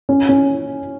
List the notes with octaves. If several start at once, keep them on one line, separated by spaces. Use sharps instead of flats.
C#4
C#4